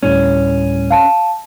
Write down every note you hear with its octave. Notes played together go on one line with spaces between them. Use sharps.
D2 A2 G3 C#4
F5 A5